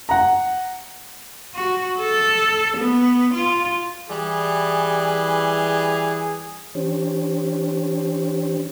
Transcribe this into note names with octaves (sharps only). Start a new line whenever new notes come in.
F#5 A#5
F#4
A4
B3
F4
E3 G3 G#4
E3 C#4 D4 G4 C5 C#5